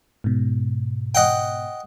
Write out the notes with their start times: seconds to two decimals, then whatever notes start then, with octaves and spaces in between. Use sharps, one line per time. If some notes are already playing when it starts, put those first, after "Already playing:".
0.24 G#2 B2
1.15 D#5 F#5 G5